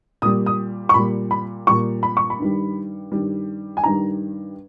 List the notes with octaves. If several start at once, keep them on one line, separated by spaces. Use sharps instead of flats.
A#2 G3 D#6
D#6
C#6
A#2 G3 B5
B5
A#2 G3 C#6
B5
C#6
B5
G2 D#3 G3
G2 D#3 G3
G#5
G2 D#3 G3 A#5